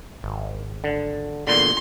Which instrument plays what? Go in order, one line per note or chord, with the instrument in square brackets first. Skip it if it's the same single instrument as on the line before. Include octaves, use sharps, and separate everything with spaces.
[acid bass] G#1
[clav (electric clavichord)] D3
[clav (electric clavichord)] E2 A#2 D3 [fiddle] C6